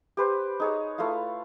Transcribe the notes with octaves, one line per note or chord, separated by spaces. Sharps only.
G4 B4 C5
D#4 G#4 C#5
A3 E4 F4 F5